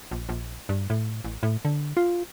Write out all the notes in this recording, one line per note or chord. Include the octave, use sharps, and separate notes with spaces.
A#1
A#1
G2
A2
A1
A2
D3
F4